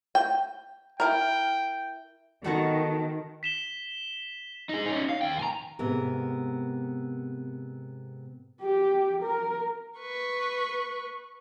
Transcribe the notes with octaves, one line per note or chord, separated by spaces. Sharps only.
G5
E4 A#4 G5
D#3 B3 F#4 A4
B6 E7 G7
D#4 G#4
C#4 D#4
F5
D#2 G5
G#5 A#5
G#2 C3 B3 A#4
G4
A#4
B4 C#6